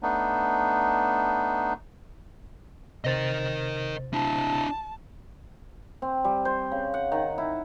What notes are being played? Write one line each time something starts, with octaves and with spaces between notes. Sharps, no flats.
A3 B3 D4 D#4
C3 A#4 C5 D#5 A6
D4 E4 A5
C4
G3
C5
C#3
F#5
D#3
E4